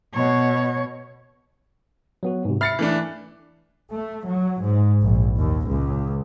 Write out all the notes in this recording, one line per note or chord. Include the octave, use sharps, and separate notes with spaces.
B2 C#5
F#3 B3 F#4
G#2 C3
E5 B5 F6 A6 C7 C#7
E3 A3 D4
A3
F#3
G#2
A#1
D#2
C#2